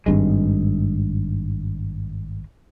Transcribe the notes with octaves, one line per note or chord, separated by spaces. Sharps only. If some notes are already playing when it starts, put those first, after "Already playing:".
G#1 G2 G#3